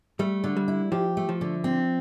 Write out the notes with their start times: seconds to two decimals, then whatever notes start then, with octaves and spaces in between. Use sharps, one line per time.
0.19 G3 A3
0.44 D3
0.57 G3
0.68 E4
0.92 F3 G4
1.17 A3
1.29 F3
1.41 D3
1.64 C4